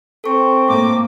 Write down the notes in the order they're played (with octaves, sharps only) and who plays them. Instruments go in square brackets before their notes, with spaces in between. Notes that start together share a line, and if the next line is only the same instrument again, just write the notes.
[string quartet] C4 [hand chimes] A4 C#6
[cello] A2 A#3 [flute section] D6